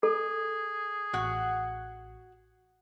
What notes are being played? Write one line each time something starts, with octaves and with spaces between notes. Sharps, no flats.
G#4 A4
A1 F#4 F#5